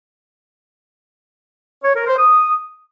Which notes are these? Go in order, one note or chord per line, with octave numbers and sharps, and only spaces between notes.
C#5
A#4
C5
D#6